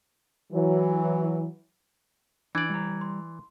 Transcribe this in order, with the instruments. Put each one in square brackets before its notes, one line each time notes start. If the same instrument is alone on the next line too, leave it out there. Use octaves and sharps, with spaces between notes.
[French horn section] E3 F#3
[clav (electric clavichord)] E3 D5 [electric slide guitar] D4 [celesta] G#6
[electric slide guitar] G3 A#5
[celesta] C6